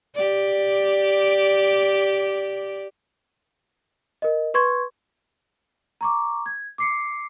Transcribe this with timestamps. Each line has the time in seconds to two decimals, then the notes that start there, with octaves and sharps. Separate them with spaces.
0.16 G4 D5
4.22 A#4 D#5
4.54 B4 C6 C#6 G#6
6.01 A#5 C#6 D6
6.46 G#6
6.78 D6 C7 C#7